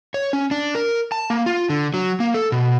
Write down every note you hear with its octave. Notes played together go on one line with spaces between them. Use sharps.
C#5
C#4
D4
A#4
A5
A#3
F4
D3
F#3
A#3
A4
B2